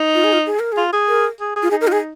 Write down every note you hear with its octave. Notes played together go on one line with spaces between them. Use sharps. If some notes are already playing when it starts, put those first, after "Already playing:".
Already playing: D#4
F4
G#4
F4
G#4
A#4
F4 G#4
G#4
A#4
G#4
G#4
F4
D#4 G#4
A#4
F4
G#4